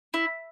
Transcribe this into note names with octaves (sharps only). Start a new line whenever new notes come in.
E4